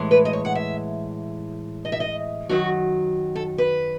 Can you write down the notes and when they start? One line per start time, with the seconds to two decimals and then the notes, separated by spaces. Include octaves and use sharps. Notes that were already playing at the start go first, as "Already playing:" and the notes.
Already playing: A2 E3 G#3
0.11 B4
0.25 D#5
0.33 C#5
0.45 F#5
0.55 E5
1.85 D#5
1.92 E5
2.00 D#5
2.49 F#2 D#3 F#3 F#4
3.35 A4
3.58 B4